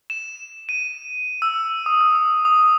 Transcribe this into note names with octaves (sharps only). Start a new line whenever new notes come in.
E7
D#7
E6
D#6
E6
D#6
D#6